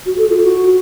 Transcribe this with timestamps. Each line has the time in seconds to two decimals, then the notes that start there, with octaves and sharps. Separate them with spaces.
0.06 F#4
0.18 A4
0.30 F4
0.42 F#4